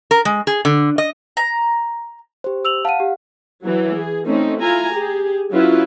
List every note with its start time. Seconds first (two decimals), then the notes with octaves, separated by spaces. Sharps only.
0.11 A#4
0.25 G#3
0.47 G#4
0.65 D3
0.98 D#5
1.37 A#5
2.44 G4 C5
2.65 E6 F7 F#7
2.85 F5 F#5 A5 D#7
3.00 G4
3.62 E3 F#3
3.92 G#4
4.26 A3 C4 C#4 D#4
4.59 E4 F4 G#5 A#5
4.93 G4 G#4
5.51 F#3 C#4 E4 F4 B4